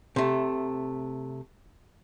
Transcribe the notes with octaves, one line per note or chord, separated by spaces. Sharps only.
C3 A3